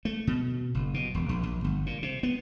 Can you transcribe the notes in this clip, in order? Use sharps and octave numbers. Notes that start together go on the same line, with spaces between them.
A3
B2
F#1
B2
E1
A#1
A#1
G1
A#2
C3
B3